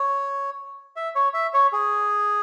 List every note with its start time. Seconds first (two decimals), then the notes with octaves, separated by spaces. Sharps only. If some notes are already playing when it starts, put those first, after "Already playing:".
Already playing: C#5
0.96 E5
1.15 C#5
1.34 E5
1.54 C#5
1.73 G#4